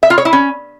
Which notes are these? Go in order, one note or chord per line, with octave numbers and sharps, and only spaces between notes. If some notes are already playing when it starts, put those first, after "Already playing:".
E5
F4
C#5
E4
C#4